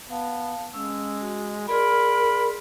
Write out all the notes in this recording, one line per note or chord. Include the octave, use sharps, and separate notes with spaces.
B3 F5 A5
G#3 C#4 E6
F#4
G#4 A#4 D5 B5 C6